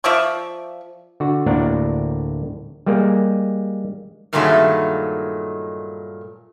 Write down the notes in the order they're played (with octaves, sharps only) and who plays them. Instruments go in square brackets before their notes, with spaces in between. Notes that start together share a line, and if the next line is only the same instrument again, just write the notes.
[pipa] F3 D5 E5 C#6
[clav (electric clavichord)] D3 F#4
D2 A2 A#3 D4 A#4 F#5
G3 G#3 A#3
[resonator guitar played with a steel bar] G2 A#2 D#3 F#3 G#3 A3